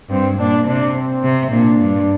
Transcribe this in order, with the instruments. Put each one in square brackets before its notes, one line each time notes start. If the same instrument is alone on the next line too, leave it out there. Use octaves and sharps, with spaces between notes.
[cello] G2 [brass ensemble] C4
[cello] A#2 [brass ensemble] D4
[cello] C3 [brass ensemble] D4
[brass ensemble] C4
[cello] C3
[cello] A#2 [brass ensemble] D4
[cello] G2